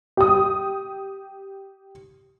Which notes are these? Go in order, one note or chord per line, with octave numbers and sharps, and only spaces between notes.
G4 D#6